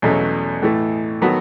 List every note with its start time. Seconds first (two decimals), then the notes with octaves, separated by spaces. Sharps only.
0.02 E2 B2 F#3 A3 C#4
0.62 A2 E3 A3
1.22 D#3 F#3 B3 F#4 A4